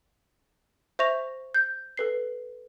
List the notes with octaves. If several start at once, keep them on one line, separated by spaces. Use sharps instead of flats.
C5 E5 C#6 A#6 F7
G6
A4 B4 C7